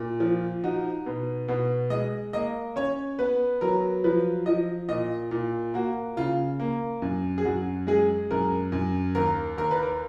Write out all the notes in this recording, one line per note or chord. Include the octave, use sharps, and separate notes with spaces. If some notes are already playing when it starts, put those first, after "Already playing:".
Already playing: A#2
F3
D#4 F#4
B2
B2 F#4
G#3 D#5
A#3 D#5
C#4 C#5
B3 B4
F#3 A#4
F3 B4
F3 D#5
A#2 D#5
A#2
A#3 F#4
C#3 F4
A#3
F#2
G#4
F#2 F#4
G#3 G#4
F#2 A#4
F#2
D#2 A#4
D#2 A#4
B4
A#4